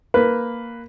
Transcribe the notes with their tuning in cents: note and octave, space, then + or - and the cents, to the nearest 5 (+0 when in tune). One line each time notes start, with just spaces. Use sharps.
A#3 +0 B4 +5